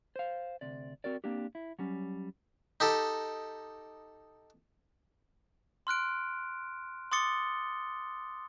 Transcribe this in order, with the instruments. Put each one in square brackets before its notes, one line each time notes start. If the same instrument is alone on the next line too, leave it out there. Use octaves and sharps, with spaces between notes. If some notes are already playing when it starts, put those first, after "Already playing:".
[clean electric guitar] C5 F5
D2 C3 D5
C4 F#4 A#4 D5
A#3 C4 D4 G4
E4
F#3 G3 C#4
[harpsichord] D#4 G4 A4
[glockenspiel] C6 F6 F#6 D7
C6 D6 D#6 A6 C#7 G7